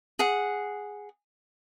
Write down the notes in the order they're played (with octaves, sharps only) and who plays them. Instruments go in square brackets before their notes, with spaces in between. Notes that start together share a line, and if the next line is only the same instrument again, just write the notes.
[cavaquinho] G#4 F#5